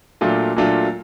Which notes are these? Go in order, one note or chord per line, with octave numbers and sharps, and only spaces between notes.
A#2 F#3 A3 D4 F4
A#2 F#3 A3 D4 F4